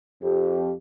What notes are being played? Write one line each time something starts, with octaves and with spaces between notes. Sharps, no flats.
F2 G4